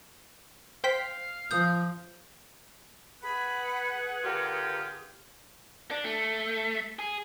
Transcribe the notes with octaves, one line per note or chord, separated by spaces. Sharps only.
C5 F5 G5 B6
F3 D#6 G6
G#4 B4 F#5 B5
D3 F4 G4 A#4
D4
A3
G#4